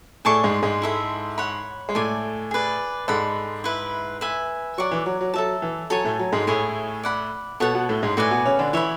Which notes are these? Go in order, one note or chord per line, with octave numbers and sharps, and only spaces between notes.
A2 A3 G#4 D5 A5 C#6
G#2 G#3
G#2 G#3
E4 A4 E5
C#5 F#5 B5
G#3
A2 A3 A4 D5 G#5
G#4 B4 D5
G#2 G#3 A4 D5 F#5 B5
E4 B4 E5
B4 E5 G#5
F#3 D5 F#5 C#6
E3
F#3
F#3
F#3 A4 E5 A5
E3
F#3 A4 C#5 G#5
A2 A3
F#3
G#2 G#3
A2 A3 E4 G#4 C#5
D5 F#5 B5
B2 B3 A4 C#5 F#5
B2 B3
A2 A3
G#2 G#3
A2 A3 F#4 B4 D5 G#5
B2 B3
C#3 C#4
D3 D4
E3 E4 C#5 E5 B5